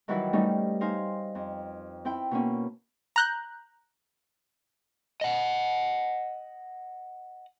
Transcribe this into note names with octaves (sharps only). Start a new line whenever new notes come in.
D#3 E3 F#3 G3 E4 B4
G3 A3 C#4 D#4
D#4 C5 F5 G#5
F2
C4 E4 G5
B2 A#3 C#4
A#5 F#6 G6
D#5 F#5